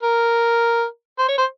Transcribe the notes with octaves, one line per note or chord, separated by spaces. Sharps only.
A#4
C5
C#5
C5